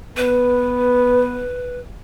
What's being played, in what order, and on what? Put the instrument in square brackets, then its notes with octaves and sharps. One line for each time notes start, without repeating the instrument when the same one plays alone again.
[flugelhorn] B3 [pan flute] B4